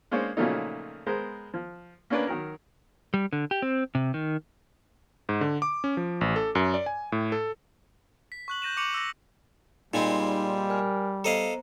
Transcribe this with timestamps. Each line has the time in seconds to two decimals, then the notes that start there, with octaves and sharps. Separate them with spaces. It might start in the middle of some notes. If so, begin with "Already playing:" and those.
0.11 G#3 A#3 C#4 D4 C5 C#5
0.37 A#2 C#3 F3 F#3 A3 D#4
1.06 G#3 B3 A#4 C5
1.54 F3
2.10 A#3 B3 C#4 D4 A#4 B4
2.27 D#3 F#3 A#4
3.14 G3
3.33 D3
3.51 G4
3.62 C4
3.95 C3
4.14 D#3
5.29 G#2
5.41 D3
5.62 D6
5.84 C#4
5.97 F3
6.21 A1
6.36 A4
6.55 F#2
6.74 D5
6.86 G#5
7.12 A2
7.32 A4
8.32 B6
8.48 C#6 F#6 F#7
8.62 G6 A#6 D#7 E7
8.77 C#6 D6 C#7 D#7 F7 F#7
8.94 E6 A#6
9.94 A#2 G3 G#3 C4 D#4 B5
10.69 A#4 G#5 F6
11.24 B3 A4 C5 D#5 F5 A#5